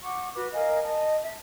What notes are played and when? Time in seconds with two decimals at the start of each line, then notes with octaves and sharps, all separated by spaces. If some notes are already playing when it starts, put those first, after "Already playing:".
0.03 F#5 C#6 D6
0.35 F#4 B4 D6
0.52 A#4 D#5 F5 G#5
0.83 D#5 A5
1.23 E5